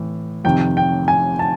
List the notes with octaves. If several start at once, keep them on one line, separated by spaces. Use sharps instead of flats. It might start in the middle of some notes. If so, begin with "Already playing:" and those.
Already playing: A2 E3
F2 C3 D#3 G5
G5
G#5
A5